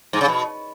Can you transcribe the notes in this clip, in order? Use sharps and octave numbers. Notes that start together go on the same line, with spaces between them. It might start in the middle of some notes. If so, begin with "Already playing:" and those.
G#2
C#3
B2